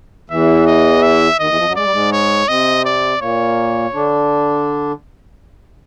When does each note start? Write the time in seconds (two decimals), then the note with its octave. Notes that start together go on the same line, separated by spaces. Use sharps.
0.30 E2 E3 E5
0.67 D#5
1.03 E5
1.39 D#2 D#3 D#5
1.48 E2 E3
1.57 F2 F3
1.66 F#2 F#3
1.76 G#3 D5
1.83 G3
1.91 G#2 G#3
2.12 C#5
2.48 C3 C4 D#5
2.85 D5
3.21 A#2 A#3 C#5
3.94 D3 D4